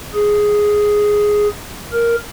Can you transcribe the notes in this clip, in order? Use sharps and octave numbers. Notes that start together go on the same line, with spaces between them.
G#4
A#4